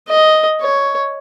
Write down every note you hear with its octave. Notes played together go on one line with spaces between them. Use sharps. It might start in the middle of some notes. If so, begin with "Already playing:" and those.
D#5
C#5